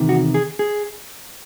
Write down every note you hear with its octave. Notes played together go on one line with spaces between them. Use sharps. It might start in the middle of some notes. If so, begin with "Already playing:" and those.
Already playing: E2 C3 D#3
F#4
G#4
G#4